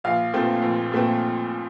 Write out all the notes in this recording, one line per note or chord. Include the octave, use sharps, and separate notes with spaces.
A#1 F5
A#2 A3 C4
A#1
A#2 A3 C4